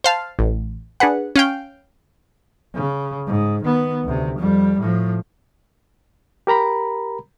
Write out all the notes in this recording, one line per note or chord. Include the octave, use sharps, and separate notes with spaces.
C5 F5 A5
A1
D4 G#4 B4 F#5
C#4 F5 G5
C#3
G#2
D#3 B3
D2 C3
F2 G3
A2 F3
G4 A#4 A#5 B5